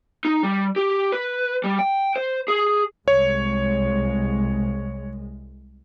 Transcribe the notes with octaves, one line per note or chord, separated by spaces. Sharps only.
D#4
G3
G4
B4
G3
G5
C5
G#4
C2 G#3 C#5